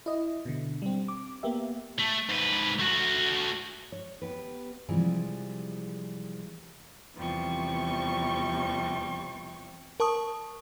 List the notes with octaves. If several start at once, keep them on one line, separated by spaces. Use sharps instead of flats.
E4 D#5
B2 D3
G3 C4
D6
A#3 B3 G4 E5
A3
G#2 B4
A3 F#4
C#5
B3 G4 B4
C3 E3 F3 G3 G#3
E2 C3 F3 G3 C#6
A#4 A5 C#6 D#6